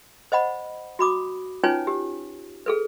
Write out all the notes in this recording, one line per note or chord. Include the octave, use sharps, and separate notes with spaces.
C5 D#5 F#5 B5
F#4 B5 D6 D#6
C#4 D#4 F4 B4 C#5 G#5
G4
G#4 A4 B4